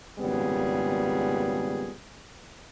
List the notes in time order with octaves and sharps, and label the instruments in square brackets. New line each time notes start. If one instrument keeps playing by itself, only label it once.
[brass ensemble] G#1 A#2 C#3 G3 B3 G#4